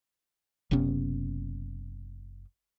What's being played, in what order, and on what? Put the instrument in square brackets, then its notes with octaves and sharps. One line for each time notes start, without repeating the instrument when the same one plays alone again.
[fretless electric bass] F#1 C3 B3 C#4